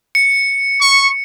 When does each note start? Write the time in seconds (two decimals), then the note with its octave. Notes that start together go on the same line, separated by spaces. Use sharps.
0.15 C#7
0.81 C#6